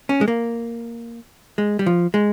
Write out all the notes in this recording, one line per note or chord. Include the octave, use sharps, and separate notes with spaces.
C#4
G#3
A#3
G#3
G3
F3
G#3